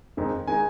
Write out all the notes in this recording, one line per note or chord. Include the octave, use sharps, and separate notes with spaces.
F2 D#3 G#3 D#4
D#3 G#3 D#4 G#5